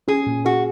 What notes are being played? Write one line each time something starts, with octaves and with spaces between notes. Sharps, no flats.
C#4 G#4
A#2
F#4 G#4